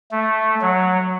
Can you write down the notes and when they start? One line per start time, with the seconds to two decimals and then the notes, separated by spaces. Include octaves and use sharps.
0.11 A3
0.61 F#3